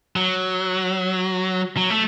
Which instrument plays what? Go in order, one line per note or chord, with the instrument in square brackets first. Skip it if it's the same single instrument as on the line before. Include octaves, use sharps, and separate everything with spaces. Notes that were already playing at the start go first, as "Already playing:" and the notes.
[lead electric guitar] F#3
F#3
A3